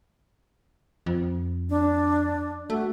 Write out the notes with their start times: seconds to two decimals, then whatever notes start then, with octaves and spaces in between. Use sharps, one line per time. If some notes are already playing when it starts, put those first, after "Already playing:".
1.06 F2
1.70 D4
2.70 A3 F#4